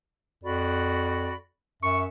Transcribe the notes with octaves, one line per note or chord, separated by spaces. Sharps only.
F2 F#4 D5 B5
F#2 E5 C#6